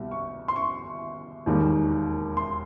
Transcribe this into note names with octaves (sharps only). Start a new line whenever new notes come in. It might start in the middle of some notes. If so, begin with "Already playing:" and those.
Already playing: C2 B2 G3
C#6
C6
C#6
E1 D#2 D#3 G3 A#3
C6